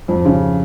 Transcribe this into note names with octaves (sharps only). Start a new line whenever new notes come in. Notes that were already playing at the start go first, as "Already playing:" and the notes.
F2
C#3